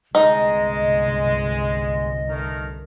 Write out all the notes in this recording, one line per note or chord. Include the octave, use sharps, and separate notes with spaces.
G1 C2 G#3 D#4 D#5
D#3 A3 A#4